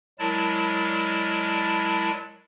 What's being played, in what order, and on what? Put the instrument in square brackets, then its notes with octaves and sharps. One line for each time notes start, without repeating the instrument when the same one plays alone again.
[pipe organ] F#3 G#3 E4 A#4 D5 A5